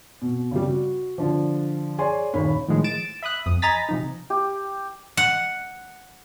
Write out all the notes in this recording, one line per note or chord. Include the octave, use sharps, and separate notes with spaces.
B2
C#3 G3
F#4
D3 F3
G#4 C#5 D5 G#5 C6
D#1 D#2 C#5 B5
A2 D#3 F3 G#3
A6 D7 E7
E5 B5 D#6 F#6
F2 D#6
D#5 G#5 A#5 B5 A6 B6
C3 F3 D#4
G4
F#5